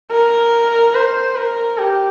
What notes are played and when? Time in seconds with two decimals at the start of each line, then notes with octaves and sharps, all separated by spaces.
0.12 A#4
0.94 C5
1.36 A#4
1.78 G4